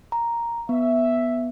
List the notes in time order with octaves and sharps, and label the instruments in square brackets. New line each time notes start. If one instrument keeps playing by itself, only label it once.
[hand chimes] A#5
[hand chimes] B3 [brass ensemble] E5